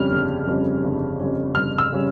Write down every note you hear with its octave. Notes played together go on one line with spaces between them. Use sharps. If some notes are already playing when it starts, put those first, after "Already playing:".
Already playing: G1 F2 C#3 G3 C#4 F6
G1
F2 C#3 G3 C#4
G1
F2 C#3 G3 C#4
G1 F6
E6
C#3 G3 C#4